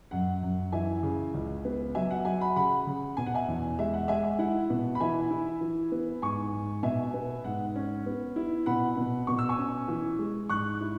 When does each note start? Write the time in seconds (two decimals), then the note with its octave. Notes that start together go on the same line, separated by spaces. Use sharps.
0.11 F#2 F#5
0.43 F#2
0.72 E3 E5 G#5
1.03 C#3
1.34 C#2
1.65 B3
1.95 F#3 E5 G#5
2.11 F#5
2.25 F#3 E5 G#5
2.40 F#5 B5
2.56 C#3 F#5 B5
2.87 C#3
3.17 B2 G#5
3.26 F#5
3.34 E5 G#5
3.48 E2
3.79 G#3 E5
3.94 F#5
4.08 G#3 E5 G#5
4.23 E5
4.39 E4 F#5
4.70 B2
4.95 B5
5.00 E3 E5 G#5
5.31 E4
5.61 E3
5.92 B3
6.22 G#2 G#5 C#6
6.52 G#2
6.83 B2 E5 G#5
7.14 B3
7.44 G#2 F#5
7.76 C#4
8.06 B3
8.36 E4
8.66 B2 F#5 B5
8.97 B2
9.27 B2 C#6
9.39 E6
9.49 G#5 C#6
9.58 C#4
9.88 E3
10.19 G#3
10.49 G#2 C#6 F#6
10.81 E4